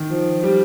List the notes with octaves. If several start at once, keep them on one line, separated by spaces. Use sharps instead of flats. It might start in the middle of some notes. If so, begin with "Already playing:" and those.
Already playing: D#3
F3
G3